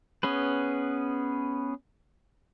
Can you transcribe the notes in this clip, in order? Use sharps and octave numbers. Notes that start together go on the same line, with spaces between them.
B3 C#4 G#4 B4